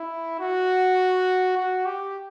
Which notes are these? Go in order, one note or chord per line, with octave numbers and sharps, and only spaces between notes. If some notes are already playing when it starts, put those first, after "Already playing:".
Already playing: E4
F#4
F#4
G4